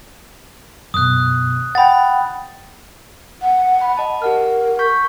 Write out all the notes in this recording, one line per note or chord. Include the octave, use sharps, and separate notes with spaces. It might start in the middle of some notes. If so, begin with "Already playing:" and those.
F#2 B2 D#6 F#6
F#5 G5 B5 A6
F#5
B5
D#5 A5
G4 A#4 F#5 F6
C#6 G6 B6